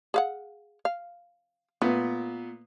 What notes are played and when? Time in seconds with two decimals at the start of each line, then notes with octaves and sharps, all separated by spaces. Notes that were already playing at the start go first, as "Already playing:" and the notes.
0.14 G#4 F5 F#5
0.85 F5
1.82 A#2 A3 B3